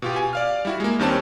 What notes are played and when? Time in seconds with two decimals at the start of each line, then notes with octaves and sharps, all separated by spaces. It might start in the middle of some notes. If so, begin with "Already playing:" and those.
0.02 B2 F4 G4
0.16 G#5
0.33 D5 F5 F6
0.65 G3 E4 F#4
0.80 G#3 A#3
0.99 D#2 D#3 G3 C4 C#4 A5